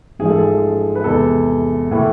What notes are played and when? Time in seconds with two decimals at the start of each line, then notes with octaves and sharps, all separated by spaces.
0.19 A1 G#2 F3 G#3 G#4
0.29 A4
0.39 G#4
0.95 B4
1.04 E2 C3 G#3 A4
1.91 A2 E3 A3